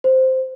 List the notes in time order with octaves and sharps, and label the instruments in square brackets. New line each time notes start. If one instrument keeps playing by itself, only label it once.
[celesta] C5